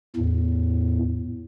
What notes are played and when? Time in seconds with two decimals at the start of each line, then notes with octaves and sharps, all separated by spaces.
0.16 E2 A2